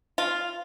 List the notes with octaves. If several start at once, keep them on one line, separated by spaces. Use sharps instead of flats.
F4